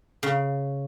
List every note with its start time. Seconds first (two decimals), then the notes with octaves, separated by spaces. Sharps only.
0.23 C#3